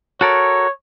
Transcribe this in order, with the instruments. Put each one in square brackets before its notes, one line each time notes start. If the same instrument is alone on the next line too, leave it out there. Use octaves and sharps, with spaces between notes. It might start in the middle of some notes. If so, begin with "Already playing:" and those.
[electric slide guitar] F#4 A4 A#4 [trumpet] C#5